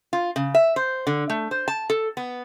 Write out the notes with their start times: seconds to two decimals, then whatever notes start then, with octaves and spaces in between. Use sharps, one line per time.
0.13 F4
0.36 C#3
0.55 E5
0.76 C5
1.07 D3
1.30 A3
1.51 C5
1.68 A5
1.90 A4
2.17 B3